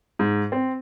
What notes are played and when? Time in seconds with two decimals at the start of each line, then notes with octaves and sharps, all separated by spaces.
0.19 G#2
0.52 C4